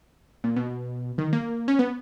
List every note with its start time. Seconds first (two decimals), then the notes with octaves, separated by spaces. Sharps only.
0.44 A#2
0.56 B2
1.18 D#3
1.33 A#3
1.68 C#4
1.79 B3